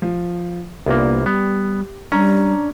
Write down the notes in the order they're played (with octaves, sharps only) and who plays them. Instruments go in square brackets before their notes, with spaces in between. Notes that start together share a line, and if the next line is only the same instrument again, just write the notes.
[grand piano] F3
[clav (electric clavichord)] C2 A#3 [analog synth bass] A#2 [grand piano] B3 D4 F4
[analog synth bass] G3 [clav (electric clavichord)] B3 [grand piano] G4
[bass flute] G3 [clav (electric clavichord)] C#4 [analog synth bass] D4 [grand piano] A#5